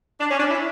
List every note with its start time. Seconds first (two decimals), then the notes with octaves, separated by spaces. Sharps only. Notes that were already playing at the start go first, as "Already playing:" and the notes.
0.18 D4
0.29 C#4
0.38 D4
0.50 E4